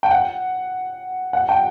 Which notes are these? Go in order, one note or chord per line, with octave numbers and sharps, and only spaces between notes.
G5
F#5
F#5
G5